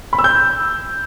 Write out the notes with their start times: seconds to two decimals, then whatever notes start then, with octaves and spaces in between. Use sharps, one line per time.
0.13 B5
0.19 E6
0.24 G6